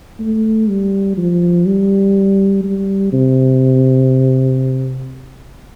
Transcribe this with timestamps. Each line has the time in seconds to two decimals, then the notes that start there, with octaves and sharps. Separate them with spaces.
0.19 A3
0.69 G3
1.17 F3
1.66 G3
2.63 G3
3.13 C3